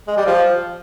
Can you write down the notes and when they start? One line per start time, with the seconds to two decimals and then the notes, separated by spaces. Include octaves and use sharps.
0.07 G#3
0.17 G3
0.26 F3